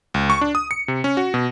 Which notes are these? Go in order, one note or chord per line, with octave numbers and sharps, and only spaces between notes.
C#2
C#6
D4
D#6
C#7
C3
C#4
F#4
B2